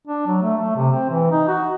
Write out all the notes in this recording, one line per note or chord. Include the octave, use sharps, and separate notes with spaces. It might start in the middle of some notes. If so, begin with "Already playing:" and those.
D4
F#3
A3
A3
C3
C4
E3
D#4
F#4